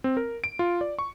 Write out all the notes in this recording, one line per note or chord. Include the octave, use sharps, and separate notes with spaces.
C4
A#4
D7
F4
D5
C#6